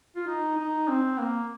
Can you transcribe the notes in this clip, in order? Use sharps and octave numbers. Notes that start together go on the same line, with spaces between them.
F4
D#4
D#4
C4
A#3